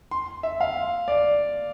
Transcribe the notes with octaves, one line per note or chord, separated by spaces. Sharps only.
C6
E5
F5
D5